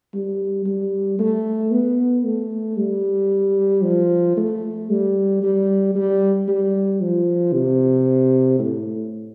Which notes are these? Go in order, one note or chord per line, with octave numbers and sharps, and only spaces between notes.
G3
G3
A3
B3
A3
G3
F3
A3
G3
G3
G3
G3
F3
C3
A2